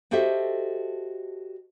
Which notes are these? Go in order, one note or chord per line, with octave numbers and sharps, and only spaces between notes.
F#4 G4 A4 C5 D#5 E5